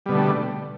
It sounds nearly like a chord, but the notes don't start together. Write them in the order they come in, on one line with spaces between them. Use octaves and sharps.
G3 B2 D3 A3